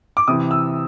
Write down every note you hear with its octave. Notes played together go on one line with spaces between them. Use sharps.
D6
C3 E3 D#6
E6